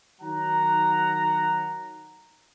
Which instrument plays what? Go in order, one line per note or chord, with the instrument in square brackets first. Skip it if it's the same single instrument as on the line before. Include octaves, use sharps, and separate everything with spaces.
[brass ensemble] D#3 F#3 F#5 A#5